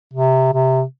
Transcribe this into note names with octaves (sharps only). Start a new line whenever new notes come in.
C3
C3